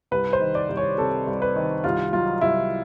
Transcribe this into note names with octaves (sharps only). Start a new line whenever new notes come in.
C2 B4
C5
D#3
D5
C2
C#5
C3 A4
C2
B4
D#3
C2 F4
F#3 F4
C2 E4